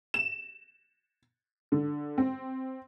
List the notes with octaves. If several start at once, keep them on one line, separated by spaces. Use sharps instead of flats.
E7
D3
C4